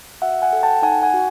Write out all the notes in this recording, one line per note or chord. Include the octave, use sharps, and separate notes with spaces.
F#4 E5 F#5
F#5 G#5
A4
G5 A5
D#4 F#5 G#5
F#5 G#5
F#4